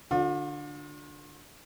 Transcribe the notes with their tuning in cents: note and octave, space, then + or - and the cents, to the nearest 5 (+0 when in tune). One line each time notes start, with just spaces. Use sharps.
D3 +5 F4 +45